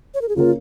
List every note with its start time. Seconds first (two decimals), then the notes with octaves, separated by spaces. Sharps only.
0.14 C#5
0.22 A#4
0.29 G#4
0.36 C#3 A#3 C#4 F4 A#4